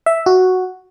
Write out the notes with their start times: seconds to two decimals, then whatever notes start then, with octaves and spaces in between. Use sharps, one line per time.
0.06 E5
0.26 F#4